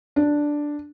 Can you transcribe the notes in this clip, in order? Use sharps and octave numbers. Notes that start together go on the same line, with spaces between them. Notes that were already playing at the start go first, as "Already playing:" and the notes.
D4